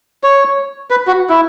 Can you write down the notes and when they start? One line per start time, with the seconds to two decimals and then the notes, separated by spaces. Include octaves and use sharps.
0.23 C#5
0.90 B4
1.07 F#4
1.30 E4